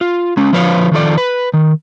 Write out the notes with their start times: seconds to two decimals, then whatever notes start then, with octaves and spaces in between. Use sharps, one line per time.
0.01 F4
0.37 G#3 C#4
0.52 D3 F3 F4 B4 C#5 F5
0.92 D#3 F3 A4 D5
1.18 B4
1.54 D#3